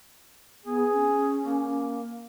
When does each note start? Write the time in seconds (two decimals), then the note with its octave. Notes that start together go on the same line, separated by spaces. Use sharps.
0.65 B3 G#4
0.92 C#4
1.44 A#3